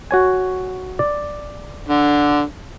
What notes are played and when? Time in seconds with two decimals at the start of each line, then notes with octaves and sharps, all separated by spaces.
0.11 F#4 C#5 G#5
0.99 D5
1.88 D3